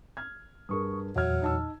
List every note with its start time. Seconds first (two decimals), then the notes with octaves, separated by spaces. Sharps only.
0.17 F6 G#6
0.69 G2 G#4 A#4 C#6 D#6
1.16 E2 A#2 F#3 E5 F6 G#6
1.42 D#4 A5 E6